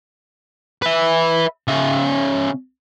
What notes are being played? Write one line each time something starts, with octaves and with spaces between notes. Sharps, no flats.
B4 E5
C#3 E5